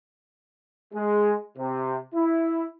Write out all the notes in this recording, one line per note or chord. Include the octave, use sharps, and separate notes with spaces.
G#3
C3
E4